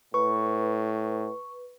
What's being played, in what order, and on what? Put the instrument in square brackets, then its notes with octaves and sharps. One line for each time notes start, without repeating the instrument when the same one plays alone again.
[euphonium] A2 [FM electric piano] B4 [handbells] C#6